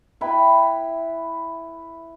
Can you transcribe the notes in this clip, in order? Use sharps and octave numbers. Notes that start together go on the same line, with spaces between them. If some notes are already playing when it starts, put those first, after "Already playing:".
E4 B4 G5 B5